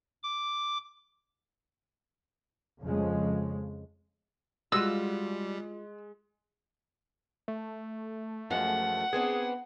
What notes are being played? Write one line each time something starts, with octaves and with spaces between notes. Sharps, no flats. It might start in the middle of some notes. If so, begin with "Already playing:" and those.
D6
F2 C#3 F3 G#3
G3 G#3 F4 F#4 E6
A3
F#2 F3 G#3 F#5
B3 C4 D4 G#4